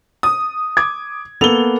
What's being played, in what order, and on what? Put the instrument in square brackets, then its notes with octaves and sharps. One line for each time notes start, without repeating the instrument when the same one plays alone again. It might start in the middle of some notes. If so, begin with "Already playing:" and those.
[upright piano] D#6
[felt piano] D6 G#6
[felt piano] A#3 B3 A4 [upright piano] F7 G7